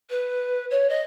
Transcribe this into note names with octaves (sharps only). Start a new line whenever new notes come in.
B4
C#5
D#5